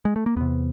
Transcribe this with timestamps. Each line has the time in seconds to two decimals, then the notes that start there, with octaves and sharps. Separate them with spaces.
0.05 G#3
0.16 A3
0.26 A#3
0.36 E2 C3 B3